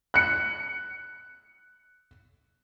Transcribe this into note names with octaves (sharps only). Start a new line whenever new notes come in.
F#6 C#7